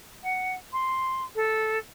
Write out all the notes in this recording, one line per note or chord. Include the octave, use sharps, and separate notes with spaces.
F#5
C6
A4